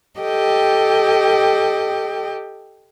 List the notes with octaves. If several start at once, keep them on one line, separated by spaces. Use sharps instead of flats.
G4 A4 D#5 G5